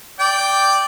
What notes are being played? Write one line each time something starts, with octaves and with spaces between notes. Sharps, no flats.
D5 G5